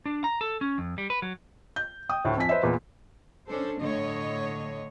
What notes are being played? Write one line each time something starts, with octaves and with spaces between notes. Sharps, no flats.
D4
A#5
A4
C#4
F2
G3
B4
F#3
G6
G5 D#6
D2 A2
F2 G#5 B6
B4 C5 D#5 E5
E2 A#2 B3
C#4 D4 A4 C5
A2 D3 C#5 D#5